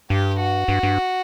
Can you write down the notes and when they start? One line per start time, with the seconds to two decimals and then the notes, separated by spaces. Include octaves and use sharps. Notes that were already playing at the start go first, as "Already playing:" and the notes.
0.10 G2 G4
0.40 F#4
0.68 G2
0.83 G2